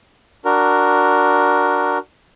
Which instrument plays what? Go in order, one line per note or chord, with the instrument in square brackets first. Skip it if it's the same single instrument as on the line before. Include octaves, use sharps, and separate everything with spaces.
[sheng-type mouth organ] D4 F#4 A#4